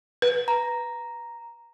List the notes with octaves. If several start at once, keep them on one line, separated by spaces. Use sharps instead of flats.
B4
A#5